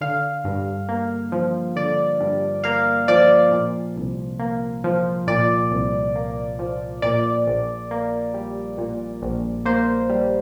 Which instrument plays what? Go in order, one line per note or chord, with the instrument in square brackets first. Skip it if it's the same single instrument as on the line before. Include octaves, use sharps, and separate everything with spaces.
[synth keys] D3 F5
G2
A#3
F3
D3 D5
G2
A#3 F5
F3 D5
A#2
C2
A#3
F3
A#2 D5
C2
A#3
F3
A#2 D5
A#1
A#3
G3
A#2
A#1
A#3 C5
G3